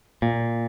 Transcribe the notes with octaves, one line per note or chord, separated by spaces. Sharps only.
A#2